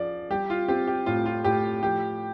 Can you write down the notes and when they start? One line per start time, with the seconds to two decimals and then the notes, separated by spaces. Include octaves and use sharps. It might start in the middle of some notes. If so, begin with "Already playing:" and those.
Already playing: F3 D5
0.30 G3 G4
0.50 F4
0.68 C4 G4
0.87 G4
1.06 A2 F4
1.26 F4
1.44 A2 G4
1.83 F3 G4